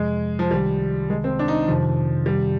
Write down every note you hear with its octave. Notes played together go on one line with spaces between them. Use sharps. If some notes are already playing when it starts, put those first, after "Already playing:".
Already playing: F2 C3 F3 G#3
F3
C2 C3 D#3 G3
G#3
C4
D4
D#4
F2 C3 D#3 F3
G3